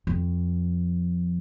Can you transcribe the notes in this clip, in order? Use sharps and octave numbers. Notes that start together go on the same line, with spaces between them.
F2